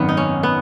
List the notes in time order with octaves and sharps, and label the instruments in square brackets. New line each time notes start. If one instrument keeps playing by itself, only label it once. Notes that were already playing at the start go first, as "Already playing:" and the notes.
Already playing: [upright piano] G#1 F#2 D#3 [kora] B3
[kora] D#4
C#4
B3